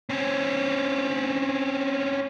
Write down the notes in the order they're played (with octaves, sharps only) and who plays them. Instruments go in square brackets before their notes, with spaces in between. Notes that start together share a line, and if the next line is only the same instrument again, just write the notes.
[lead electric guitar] C4 C#4